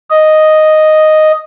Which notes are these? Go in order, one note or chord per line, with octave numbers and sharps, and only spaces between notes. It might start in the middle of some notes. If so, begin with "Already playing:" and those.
D#5